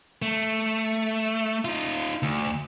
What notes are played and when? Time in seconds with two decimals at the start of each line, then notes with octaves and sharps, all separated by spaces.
0.22 A3
1.65 D#4 F4
2.23 D2